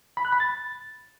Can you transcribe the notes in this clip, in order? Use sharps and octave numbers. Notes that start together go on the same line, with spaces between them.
B5
F#6
B5
A6